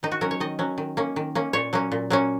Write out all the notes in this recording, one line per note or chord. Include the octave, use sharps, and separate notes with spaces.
D#3 D#4
F#4
F#3 C#4 A#4
C#5
D#3 D#5
F#3 C#4
D#3
A#3 C#4
D#3
A#3 C#4
A#2 C#5
F#3 A#3 C#4
A#2
F#3 A#3 C#4